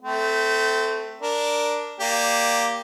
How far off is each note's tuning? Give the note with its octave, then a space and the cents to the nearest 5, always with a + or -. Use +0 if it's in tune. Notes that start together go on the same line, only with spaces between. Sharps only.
A3 +0 C4 -25
D4 +0 A#4 +0
A#3 +0 G4 +0 D5 +0